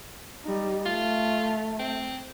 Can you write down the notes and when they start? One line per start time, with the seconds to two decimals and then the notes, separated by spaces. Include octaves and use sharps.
0.43 G3 D#4
0.86 A3 F4
1.79 C4